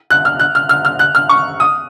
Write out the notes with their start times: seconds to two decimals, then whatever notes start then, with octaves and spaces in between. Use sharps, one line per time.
0.10 F#6
0.25 F6
0.39 F#6
0.55 F6
0.69 F6
0.85 F6
0.99 F#6
1.15 F6
1.29 C#6
1.60 D#6